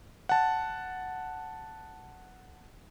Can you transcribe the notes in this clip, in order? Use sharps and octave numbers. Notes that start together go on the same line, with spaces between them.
F#5 A5